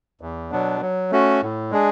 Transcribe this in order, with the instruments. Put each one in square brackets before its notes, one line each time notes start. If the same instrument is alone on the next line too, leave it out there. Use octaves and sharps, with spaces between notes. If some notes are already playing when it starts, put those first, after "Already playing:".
[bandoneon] E2
B2 F#3 B3 D4
F#3
A3 C#4 F#4
A2
G#3 D4 G#4